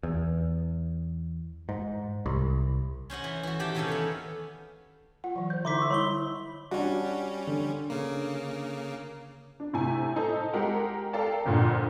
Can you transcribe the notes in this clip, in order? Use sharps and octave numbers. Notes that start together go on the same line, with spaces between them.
E2
G#2
C2
C#4 C5 D#5 F#5
E3
E3 F#4
D#3 G4 F#5 G5 A5
E2 C3 D#3 C#4 A4 F5
B3 C#5
F4 F#5
E3 F#3
C5 G6
D3 D#4 E4 E5 C6 D6 B6
C#6 E6
G3 E4 C#5 B5 C6 G7
G3 C#4 D4 F#4
D3
C#3 A#3
D4
A2 C3 E4 G#5
D#4 A4 C5
G#3 G4 A#4 F#5
A4 A#4 D5 F5 G5 A5
G1 F2 A#2 D3 F#5